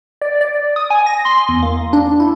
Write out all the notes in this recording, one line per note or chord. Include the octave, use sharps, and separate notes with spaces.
D5
D5
D#6
G#5
A#6
C6
E2
A#3
D4
E4